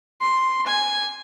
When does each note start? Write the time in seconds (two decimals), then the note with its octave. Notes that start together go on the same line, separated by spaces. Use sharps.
0.21 C6
0.67 G#5